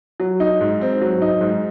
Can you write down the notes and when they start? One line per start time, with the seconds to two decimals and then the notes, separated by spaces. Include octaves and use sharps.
0.20 F#3
0.40 D#4
0.61 G#2
0.81 C4
1.01 F#3
1.22 D#4
1.41 G#2